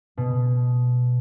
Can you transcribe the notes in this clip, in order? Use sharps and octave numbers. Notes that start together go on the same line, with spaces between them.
B2